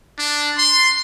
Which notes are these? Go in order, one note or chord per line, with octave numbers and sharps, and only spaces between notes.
D4
C6